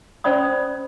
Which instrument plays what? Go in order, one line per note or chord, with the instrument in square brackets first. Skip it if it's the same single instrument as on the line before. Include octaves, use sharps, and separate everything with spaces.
[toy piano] C#4 C5 D5 B5 D#6